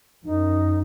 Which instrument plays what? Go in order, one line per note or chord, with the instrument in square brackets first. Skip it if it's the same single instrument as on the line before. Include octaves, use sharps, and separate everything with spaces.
[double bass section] F#2 [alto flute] D#4